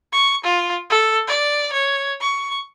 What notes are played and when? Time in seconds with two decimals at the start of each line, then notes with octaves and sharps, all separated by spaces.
0.13 C#6
0.44 F4
0.90 A4
1.28 D5
1.73 C#5
2.21 C#6